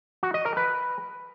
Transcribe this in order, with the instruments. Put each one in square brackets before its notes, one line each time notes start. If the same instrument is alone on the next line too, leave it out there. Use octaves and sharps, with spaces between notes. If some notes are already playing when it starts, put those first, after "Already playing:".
[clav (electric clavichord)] F#4
D#5
A#4
B4